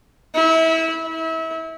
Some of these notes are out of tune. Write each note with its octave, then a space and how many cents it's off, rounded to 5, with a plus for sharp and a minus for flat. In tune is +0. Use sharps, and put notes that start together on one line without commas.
E4 -25
E4 -30